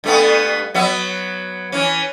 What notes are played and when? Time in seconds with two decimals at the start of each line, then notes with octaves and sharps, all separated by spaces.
0.04 G2 A3 B3
0.74 F#3 B3 E5
1.72 E3 C#4